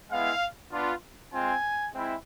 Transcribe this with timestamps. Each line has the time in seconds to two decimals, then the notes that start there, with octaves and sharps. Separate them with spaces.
0.10 G#3 B3 E4 F5
0.72 B3 D4 F4
1.32 G#3 C4 F4 G#5
1.94 G#3 C4 E4